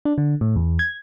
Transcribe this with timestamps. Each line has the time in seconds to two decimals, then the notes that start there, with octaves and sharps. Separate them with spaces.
0.05 D4
0.18 D3
0.41 A2
0.56 E2
0.79 G#6